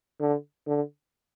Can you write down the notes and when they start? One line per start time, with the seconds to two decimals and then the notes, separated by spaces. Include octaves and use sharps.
0.20 D3
0.67 D3